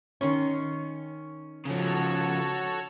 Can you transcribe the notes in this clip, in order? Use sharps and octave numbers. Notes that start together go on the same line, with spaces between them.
D#3 C#4 C6 C#6
C#3 F3 F#4 A4 C#5